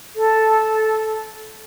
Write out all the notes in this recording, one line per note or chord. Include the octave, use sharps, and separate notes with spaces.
A4